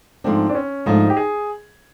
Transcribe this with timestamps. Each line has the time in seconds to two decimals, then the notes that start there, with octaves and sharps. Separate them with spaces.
0.24 G#2 F3 A3 C4 D4
0.49 D4
0.55 C#4
0.86 G#2 F3 A3 D4 D#4
1.10 G4
1.17 G#4